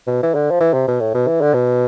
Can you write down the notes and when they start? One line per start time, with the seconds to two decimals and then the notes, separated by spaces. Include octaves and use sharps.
0.07 B2
0.23 E3
0.34 D3
0.51 F3
0.60 E3
0.74 C3
0.88 B2
1.00 A2
1.14 B2
1.28 E3
1.41 D3
1.54 B2